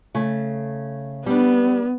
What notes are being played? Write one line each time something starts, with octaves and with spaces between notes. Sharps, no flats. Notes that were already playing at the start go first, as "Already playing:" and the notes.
C#3 A3
G3 B3 D4